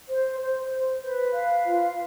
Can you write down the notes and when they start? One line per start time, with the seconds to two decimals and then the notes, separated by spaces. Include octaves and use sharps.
0.09 C5
0.40 C5
0.71 C5
1.02 B4
1.33 F5
1.64 F4